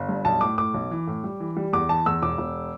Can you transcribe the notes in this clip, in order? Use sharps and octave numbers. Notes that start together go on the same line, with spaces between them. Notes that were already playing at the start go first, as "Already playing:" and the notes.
Already playing: G1
G2
B1 A5
A2 D6
A2 D6
B1
E3
A2
G3
E3
G3
E2 D6
E3 A5
E2 E6
E1 D6
E1